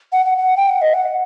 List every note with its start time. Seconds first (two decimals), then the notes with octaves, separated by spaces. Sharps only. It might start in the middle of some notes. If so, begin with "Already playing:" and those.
0.13 F#5
0.26 F#5
0.37 F#5
0.57 G5
0.69 F#5
0.82 D#5
0.94 F#5